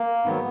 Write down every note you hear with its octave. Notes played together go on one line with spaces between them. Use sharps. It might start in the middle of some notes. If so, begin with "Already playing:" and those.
Already playing: A#3
G#2 D#3 F#3 B3